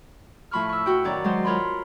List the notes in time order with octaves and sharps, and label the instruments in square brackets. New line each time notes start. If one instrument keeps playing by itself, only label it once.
[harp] A2 F3 B5 C#6 F6
C#6 E6
F#4 G5
F#2 D#3 C#5 D5
F#3 G#3 C5
F4 A#4 C#5 B5 C6